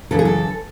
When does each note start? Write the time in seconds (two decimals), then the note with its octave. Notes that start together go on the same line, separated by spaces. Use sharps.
0.11 F#2 C#3 E3 A4
0.19 G#4
0.25 A4